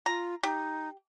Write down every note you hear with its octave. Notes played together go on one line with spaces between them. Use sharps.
F4 A#5
D#4 G4